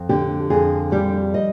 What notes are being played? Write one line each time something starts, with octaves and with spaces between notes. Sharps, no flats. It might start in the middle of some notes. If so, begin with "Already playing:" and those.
Already playing: F2
D3 G4
F2 G#4
G3 G4
D#5